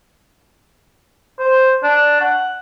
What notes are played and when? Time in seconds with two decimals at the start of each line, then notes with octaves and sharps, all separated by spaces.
1.39 C5
1.83 D4
2.21 F#5